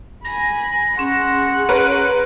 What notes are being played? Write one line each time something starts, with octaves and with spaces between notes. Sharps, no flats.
G#5 B5 A#6
C#4 G#4 F#5 C6
A#4 B4 C#5 F#6